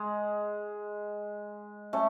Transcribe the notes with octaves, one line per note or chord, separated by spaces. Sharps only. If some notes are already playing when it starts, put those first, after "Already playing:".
Already playing: G#3
A3 C#4